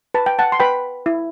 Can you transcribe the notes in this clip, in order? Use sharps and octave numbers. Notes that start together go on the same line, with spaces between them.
B4 A5
G5
F#5 A5
C6
B4 G5 B5
E4